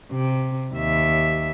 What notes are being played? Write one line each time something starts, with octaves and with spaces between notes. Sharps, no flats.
C3
D#2 E5